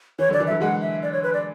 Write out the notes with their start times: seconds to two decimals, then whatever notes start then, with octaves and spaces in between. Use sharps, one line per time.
0.19 E3 C#5
0.29 D3 F#3
0.33 D5
0.40 E3
0.47 D3 F#3 E5
0.61 E3 G#3 F#5
0.81 E5
1.02 D5
1.13 C#5
1.23 B4
1.33 D5